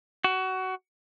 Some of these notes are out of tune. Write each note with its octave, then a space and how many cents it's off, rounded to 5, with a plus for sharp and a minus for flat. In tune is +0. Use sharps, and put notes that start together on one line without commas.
F#4 +20